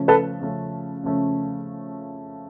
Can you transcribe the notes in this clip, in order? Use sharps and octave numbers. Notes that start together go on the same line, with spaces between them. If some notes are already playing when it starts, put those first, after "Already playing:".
Already playing: C#3 F3 A3 C#4
A4 B4
C#3 F3 A3 C#4
C#3 F3 A3 C#4